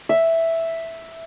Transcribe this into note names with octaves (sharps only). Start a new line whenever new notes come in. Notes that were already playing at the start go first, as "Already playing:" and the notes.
E5